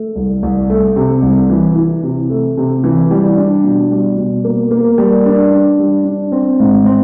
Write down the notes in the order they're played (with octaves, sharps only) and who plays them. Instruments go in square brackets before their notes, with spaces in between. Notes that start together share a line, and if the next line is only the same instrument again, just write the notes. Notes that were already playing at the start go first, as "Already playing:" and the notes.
Already playing: [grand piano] A3
C2
C2
A3
C3
C2
E3
E3
C3
A3
C3
E3
G3
D4
B2
G3
B2
A#3
A#3
G3
D4
D4
G3
D4
C4
G#2
C4